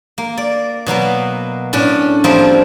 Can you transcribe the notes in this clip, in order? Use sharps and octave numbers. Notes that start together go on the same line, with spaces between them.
A#3
D5
B2 F#3 A#3 B3
A2 C#4 D4
F3 G3 A#3 C4 E4 G#4